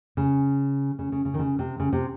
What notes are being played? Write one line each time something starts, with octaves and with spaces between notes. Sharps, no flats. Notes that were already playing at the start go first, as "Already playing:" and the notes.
C#3
C#3
C#3
C#3
D#3
C#3
C3
C#3
C3